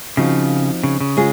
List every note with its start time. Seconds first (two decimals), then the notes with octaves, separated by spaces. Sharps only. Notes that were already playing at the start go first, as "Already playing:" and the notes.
0.17 C#3 F3 C4 D#4 F#4
0.84 C#3
1.00 C#3
1.17 G#3 C#4 F4 G#4